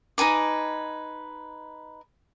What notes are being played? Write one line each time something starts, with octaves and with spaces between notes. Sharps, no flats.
D#4 B4 G#5 D6